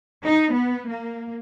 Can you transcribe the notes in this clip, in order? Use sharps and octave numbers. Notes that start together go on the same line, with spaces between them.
D#4
B3
A#3